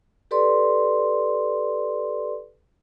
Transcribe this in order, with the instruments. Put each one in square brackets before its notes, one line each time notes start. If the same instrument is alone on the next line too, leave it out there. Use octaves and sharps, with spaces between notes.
[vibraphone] G4 A4 B4 D5 C6